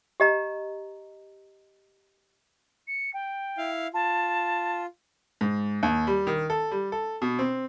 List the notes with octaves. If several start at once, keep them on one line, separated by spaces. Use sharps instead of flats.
G4 D#5 A#5
C#7
G5
E4 F5
F4 A5
G#2
D#2
G3
D#3
A4
G3
A4
B2
C4